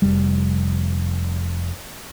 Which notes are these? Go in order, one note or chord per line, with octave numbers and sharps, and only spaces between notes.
F1 G3